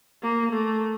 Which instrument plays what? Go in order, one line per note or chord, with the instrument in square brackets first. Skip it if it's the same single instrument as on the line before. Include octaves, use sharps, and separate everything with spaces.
[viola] A#3
A3